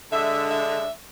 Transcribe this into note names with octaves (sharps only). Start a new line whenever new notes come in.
D3 G#3 D4 E5
E5